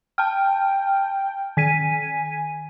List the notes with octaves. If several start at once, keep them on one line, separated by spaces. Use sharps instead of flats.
G5 A5 F6
D#3 G#5 B6 D#7